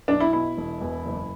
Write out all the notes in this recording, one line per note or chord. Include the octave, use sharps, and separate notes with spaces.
B1 D4
E4
B2 E4
E1
E2
F#1